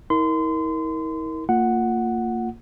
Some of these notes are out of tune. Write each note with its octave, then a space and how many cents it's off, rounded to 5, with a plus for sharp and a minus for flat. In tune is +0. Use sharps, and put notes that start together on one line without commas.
E4 -45 A#4 +0 C6 -30
A#3 -30 F4 +0 F#5 +0